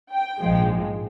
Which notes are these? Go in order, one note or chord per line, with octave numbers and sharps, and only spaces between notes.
G5
A#1 G#2 F3 G#3